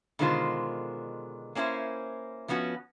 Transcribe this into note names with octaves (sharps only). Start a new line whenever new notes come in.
B2 D3 D#3 G#3 F4 C5
A#3 C#4 D4 E4 C5
F3 A3 B3 C#4 F#4